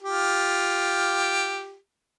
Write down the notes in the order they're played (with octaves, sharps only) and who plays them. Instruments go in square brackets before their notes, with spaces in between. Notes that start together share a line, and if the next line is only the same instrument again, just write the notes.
[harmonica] F4 G4